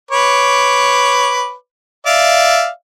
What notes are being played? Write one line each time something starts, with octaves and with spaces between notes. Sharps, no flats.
B4 C#5 D6
D5 E5 F5